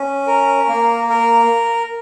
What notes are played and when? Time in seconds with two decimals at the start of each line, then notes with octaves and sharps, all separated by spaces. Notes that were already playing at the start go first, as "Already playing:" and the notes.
Already playing: C#4
0.27 A#4
0.68 A#3
1.10 A#4